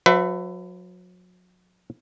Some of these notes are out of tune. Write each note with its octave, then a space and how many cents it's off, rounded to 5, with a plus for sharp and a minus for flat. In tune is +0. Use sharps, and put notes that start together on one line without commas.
F#3 -35 B4 +25 E5 +15